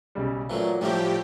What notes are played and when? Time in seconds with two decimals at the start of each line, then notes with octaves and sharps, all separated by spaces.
0.15 B1 C#3 G3
0.50 A#2 E3 F#3 A3 C#4
0.81 A2 F3 G3 C#4 E4 G4